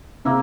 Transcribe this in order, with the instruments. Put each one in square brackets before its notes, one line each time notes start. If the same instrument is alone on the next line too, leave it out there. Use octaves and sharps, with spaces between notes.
[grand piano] C3 [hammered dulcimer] A#3 E4